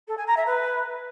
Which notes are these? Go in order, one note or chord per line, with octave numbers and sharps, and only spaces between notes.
A4
G#5
A#5
E5
B4